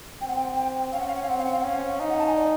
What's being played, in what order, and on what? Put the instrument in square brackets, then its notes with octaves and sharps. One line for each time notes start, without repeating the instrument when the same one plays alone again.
[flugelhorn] C4 [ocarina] G5
[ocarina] F#5
G5
G5
[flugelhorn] C#4 [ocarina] F5
[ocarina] F#5
F5
F#5
F5
[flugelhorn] C4 [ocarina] F#5
[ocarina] F5
F#5
F5
F#5
[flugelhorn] C#4 [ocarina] F5
[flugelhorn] D#4 [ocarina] F5
[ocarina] F#5
A5
G#5
D5